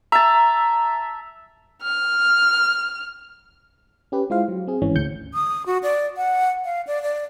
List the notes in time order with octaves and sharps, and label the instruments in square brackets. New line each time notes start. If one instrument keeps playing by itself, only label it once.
[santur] E5 A5 [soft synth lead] A#5
[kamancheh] F6
[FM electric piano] C#4 G4 B4
G#3 E4 F4 C5 F5
F#3
C4 G#4
G1 G#2 E3 C#4
D2 G6 C#7
[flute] D#6
F#4
D5
F#5
F5
D5
D5